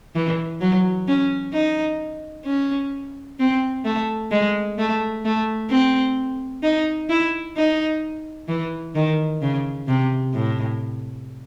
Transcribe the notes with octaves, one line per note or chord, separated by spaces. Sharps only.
E3
F#3
C#4
D#4
C#4
C4
A3
G#3
A3
A3
C4
D#4
E4
D#4
E3
D#3
C#3
C3
A2